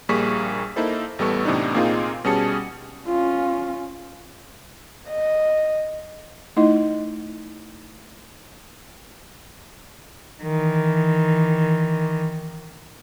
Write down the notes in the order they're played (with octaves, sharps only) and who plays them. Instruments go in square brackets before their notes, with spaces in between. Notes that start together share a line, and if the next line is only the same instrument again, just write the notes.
[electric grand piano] A#1 G3 A#3 G#4 C#6 B6
A#3 D#4 E4 A4 C5
A1 G3 B3 A4 C#6
A2 C3 E3 B3 D4 D#4
A#2 A#3 C4 D#4 F4 G#4
B2 G3 C#4 G#4 A5 C#7
[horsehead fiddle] C#4 F4
[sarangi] D#5
[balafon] A3 D#4 E4 D#5
[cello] D#3 E3